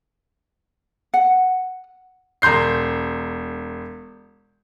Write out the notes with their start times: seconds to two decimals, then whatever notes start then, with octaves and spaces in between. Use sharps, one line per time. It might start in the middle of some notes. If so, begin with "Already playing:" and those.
1.14 F#5
2.42 E1 A#5 C6 G6 C7